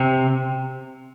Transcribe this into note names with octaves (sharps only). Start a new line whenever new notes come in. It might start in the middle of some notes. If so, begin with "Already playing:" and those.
Already playing: C3